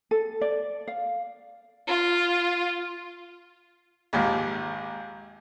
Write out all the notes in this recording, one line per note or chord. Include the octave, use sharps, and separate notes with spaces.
A4
D5
F5
F4
A#1 D#2 G#2